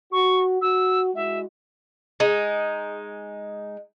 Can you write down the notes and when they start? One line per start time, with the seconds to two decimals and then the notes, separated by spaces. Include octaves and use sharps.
0.11 F#4 C#6
0.61 F#4 E6
1.15 G#3 E4 F#4 E5
2.20 G#3 D#4